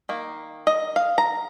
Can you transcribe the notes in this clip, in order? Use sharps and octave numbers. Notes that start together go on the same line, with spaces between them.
D#3 A#3
D#5
F5
A#5